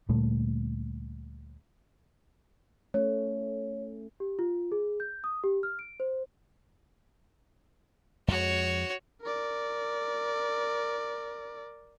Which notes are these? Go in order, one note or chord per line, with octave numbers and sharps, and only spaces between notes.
D2 A#2 G3 A3
A3 C#4 C#5
G4
F4
G#4
G6
D#6
G4
F6
D7
C5
F2 G#3 F#4 C#5
A#4 D5